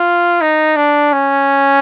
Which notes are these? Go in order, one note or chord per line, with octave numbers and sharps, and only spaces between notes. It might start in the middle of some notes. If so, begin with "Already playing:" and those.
Already playing: F4
D#4
D4
C#4